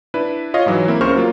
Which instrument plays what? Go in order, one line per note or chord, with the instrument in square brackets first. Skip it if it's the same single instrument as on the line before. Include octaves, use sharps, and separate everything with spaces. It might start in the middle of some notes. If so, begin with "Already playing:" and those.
[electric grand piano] D4 E4 B4
F4 C#5 D#5 F5
G#2 E3 F#3
A#3 C4 E4
C#2 C#3 A#4 C5 C#6 F6
F#3 A#3 F4